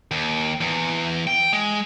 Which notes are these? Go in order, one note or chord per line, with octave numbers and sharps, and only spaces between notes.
D#2
E2
G5
G#3